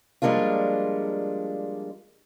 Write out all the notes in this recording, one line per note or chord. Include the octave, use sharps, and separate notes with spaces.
F3 G3 G#3 A#3 D4 F4